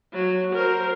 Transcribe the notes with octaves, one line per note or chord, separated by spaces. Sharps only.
F#3
A#4 C5